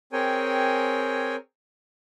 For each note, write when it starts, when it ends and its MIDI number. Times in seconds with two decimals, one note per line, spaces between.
0.13 1.36 60
0.13 1.36 68
0.13 1.36 70
0.13 1.36 73
0.13 1.36 79
0.13 1.36 80